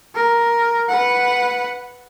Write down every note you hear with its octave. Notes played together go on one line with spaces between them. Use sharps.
A#4
B4 F#5